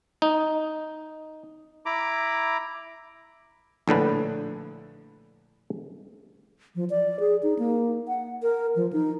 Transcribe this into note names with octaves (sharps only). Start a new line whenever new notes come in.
D#4
E4 A#5 B5 D6
A#1 A2 D3 B4
F3
D5
G#4
D#4
A#3
F#5
A#4
F3
D#4